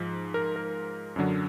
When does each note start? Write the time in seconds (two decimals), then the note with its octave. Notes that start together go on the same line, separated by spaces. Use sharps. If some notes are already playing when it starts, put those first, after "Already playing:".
Already playing: G#2 F3
0.34 A#4
0.56 A#4
1.16 F#2 D3 F#3